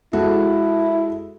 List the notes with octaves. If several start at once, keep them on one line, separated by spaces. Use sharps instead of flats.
G#3 E4 F#4 A4